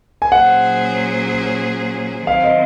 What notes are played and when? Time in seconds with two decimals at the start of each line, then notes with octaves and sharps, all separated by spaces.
0.22 G#5
0.32 A#2 F#3 C#4 G#4 C5 F#5
2.27 D#3 F#3 C4 F5
2.44 D#5